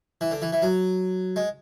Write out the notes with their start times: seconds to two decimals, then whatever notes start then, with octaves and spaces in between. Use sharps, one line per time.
0.21 E3
0.32 D3
0.42 E3
0.53 E3
0.62 F#3
1.36 G#3